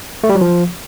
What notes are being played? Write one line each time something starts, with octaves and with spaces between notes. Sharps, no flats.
A3
G3
F#3
F3